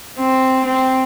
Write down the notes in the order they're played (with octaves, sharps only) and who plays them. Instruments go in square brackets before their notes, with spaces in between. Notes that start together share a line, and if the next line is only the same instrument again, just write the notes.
[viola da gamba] C4
C4